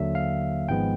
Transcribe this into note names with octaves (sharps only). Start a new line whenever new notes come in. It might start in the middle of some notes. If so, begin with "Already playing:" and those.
Already playing: D#2 D3 F#3 A#3 E5
F5
G#1 G#2 F3 G#3 B3 G5